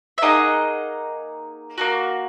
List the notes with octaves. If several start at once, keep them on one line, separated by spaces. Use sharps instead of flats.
E5
A#3 D#4 G#4 D#5 F#5
A#3 D#4 F#4